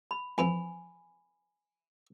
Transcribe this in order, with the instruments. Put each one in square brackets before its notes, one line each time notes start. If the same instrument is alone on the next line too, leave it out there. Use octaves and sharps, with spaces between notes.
[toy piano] B5
[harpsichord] F2 E3 F3 [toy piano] G#5 B5